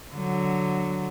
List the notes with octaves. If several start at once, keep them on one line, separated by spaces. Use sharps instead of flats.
D3 F#3